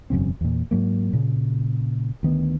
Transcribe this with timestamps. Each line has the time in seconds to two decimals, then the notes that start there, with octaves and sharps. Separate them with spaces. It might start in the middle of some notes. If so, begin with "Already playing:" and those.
0.10 E1 F#2 C#3 C4
0.41 E2 A#2
0.71 G#2 F#3 A#3
1.13 A#2 C#3
2.23 D2 D#3 B3